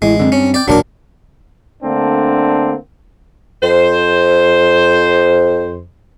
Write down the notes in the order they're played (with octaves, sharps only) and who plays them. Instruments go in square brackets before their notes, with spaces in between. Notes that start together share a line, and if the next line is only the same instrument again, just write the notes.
[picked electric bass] A1 [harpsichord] G#3 [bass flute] E4
[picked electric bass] F#2 A#2 D3 [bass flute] C4
[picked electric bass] G2 [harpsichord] C#4
[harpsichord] D5 G5
[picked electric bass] D#1 A1 A#2 [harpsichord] F#3 A#4 D6 [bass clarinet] D4
[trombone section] D3 A3 A#3 C4 D4
[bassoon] F2 [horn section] C5